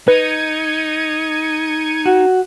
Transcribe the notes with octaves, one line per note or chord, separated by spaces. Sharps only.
D#4 B4 G#6 C#7 D#7
F#4